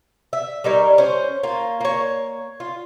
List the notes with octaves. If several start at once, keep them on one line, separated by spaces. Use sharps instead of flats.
E5
G3 D#4 A#4 C#5
C#4 C5
A#3 F4 C#5
A#3 C#5
F4